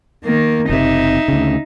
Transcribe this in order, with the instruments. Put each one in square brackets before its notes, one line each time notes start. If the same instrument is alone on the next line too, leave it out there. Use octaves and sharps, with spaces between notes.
[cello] D#3 A#3
[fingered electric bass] F#1 C3 [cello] D#4 E5
[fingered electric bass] D2 C#3